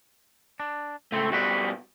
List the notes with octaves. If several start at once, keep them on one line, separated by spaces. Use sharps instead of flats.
D4
C#2 A2 A3 C4
B2 G3 C4 F#4 B4